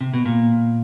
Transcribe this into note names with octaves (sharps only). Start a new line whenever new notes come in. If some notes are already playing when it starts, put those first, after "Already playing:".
C3
B2
A#2